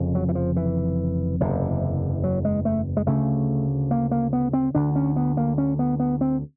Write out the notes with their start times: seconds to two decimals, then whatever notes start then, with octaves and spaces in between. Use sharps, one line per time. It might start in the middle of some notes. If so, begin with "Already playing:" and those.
Already playing: F1 F2 C#3
0.15 F#3
0.29 E3
0.35 F3
0.56 E3
1.40 F#1 E2 C3
2.24 F#3
2.45 G#3
2.65 A3
2.97 G#3
3.07 D2 C#3 A3
3.91 A#3
4.11 A#3
4.33 B3
4.53 C4
4.75 D2 D3 D4
4.96 C#4
5.16 B3
5.37 A#3
5.58 C#4
5.79 B3
6.00 B3
6.21 C4